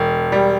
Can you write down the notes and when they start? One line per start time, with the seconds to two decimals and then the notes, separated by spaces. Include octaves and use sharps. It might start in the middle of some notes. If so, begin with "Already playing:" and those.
Already playing: E1
0.32 G3